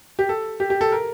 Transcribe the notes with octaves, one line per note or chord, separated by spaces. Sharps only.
G4
A4
G4
G4
A4
A#4